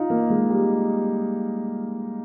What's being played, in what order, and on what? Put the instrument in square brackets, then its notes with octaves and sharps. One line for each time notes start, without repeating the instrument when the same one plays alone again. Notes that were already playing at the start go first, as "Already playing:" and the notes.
Already playing: [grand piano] D#4 F4
A#3
G#3
G3